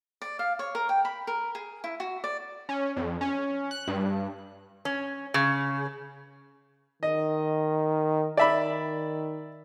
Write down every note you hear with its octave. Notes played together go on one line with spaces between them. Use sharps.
D5
F5
C#5
A#4
G5
B5
A#4
G#4
E4
F#4
D5
C#4
F2
C#4
F#6
G2
C#4
C#3
D#3 D#5
D#3 D5 E5 B5